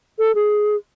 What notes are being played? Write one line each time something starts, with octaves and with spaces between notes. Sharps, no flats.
A4
G#4